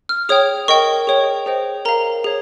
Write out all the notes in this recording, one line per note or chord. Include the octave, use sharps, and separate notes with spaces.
F6
G#4 C#5 G5 D#6
A#4 D#5 G5 C#6
G#4 C#5 G5
G#4 C5 D#5 G5
A#4 F5 A#5
G#4 C#5